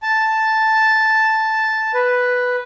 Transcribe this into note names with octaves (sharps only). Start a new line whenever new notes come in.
A5
B4